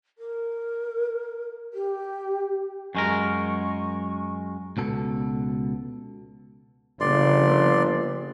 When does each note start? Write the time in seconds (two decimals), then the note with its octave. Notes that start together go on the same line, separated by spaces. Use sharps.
0.18 A#4
1.74 G4
2.95 F#2 G#3 A#4 C#6
4.77 C#2 B2 A4
7.00 G1 C#3 F3 A#3 D5 C6